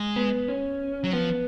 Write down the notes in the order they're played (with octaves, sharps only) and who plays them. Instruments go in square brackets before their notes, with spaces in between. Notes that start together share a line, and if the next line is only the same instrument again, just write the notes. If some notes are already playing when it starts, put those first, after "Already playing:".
Already playing: [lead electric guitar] G#3
[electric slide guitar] B3
C#4
[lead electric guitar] F#3
[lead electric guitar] F3 [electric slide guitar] B3